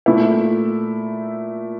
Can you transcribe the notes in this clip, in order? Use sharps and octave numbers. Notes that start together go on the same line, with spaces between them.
A#2 A3 E4